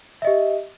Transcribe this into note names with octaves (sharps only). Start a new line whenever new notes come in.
G4 D#5 E5